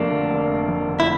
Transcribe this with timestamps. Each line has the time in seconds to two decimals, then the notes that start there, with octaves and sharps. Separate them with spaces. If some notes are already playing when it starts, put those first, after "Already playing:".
Already playing: F1 F2 A3 A#3 D4
0.11 D3
0.30 F1
0.50 A3
0.69 F2
0.88 D3
1.00 E4